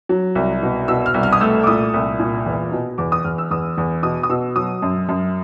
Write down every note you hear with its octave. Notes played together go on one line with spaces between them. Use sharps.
F#3
C2
B2
B2 E6
F6
C2
F6
D#6
A3 E6
D6
A#2 D#6
C2
A#2
E2
B2
E2 D6
D#6
E2 F6
E6
E2 D#6
E2
B2 D#6
D#6
B2 E6
F#3 D#6
F#2
F#2